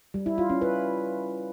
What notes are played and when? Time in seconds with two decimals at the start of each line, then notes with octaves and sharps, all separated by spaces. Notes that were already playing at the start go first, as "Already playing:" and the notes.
0.14 G3
0.26 E4
0.38 F4
0.50 C#4
0.62 B4